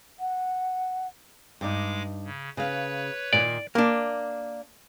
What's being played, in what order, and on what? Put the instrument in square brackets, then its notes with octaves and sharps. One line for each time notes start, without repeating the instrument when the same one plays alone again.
[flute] F#5
[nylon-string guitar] G2 D#4 [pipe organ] G#3 D6
[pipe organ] C#3
[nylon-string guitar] C#3 F5 [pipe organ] B4 C#5
[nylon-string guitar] A#2 D#3 A#3 [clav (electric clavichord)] D5
[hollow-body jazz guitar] A#3 D4